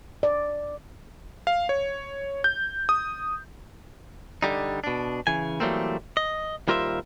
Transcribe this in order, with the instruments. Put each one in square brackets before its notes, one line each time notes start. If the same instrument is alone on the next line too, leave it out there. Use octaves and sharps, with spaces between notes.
[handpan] D5
[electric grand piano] F5
C#5
G6
D#6
[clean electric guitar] D3 G3 D#4
B2 D4
C#3 E3 G#5
E3 F#3 G3 A3 A#3 C4
D#5
D#2 G3 F4 A#4 C5 E5